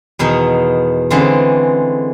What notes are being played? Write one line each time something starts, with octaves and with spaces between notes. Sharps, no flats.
E2 B2 D#3 D#4
D3 E3 G#3 C4 C#4